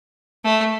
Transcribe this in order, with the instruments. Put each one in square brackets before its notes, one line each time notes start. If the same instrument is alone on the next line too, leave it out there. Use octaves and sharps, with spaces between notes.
[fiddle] A3